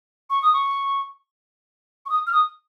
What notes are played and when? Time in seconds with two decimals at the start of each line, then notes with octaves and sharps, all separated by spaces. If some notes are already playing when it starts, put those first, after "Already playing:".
0.30 C#6
0.42 D#6
0.53 C#6
2.06 C#6
2.09 D#6
2.27 F6
2.32 D#6